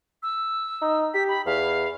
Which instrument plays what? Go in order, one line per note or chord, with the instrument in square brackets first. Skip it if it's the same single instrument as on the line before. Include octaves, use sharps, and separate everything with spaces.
[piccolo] E6
[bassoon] D#4
[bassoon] G4 [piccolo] B6
[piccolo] B5
[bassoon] E2 [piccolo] F5